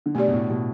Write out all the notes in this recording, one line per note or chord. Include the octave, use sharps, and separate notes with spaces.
D3
B2 A3 D4 G4 D5
B2
A2
B2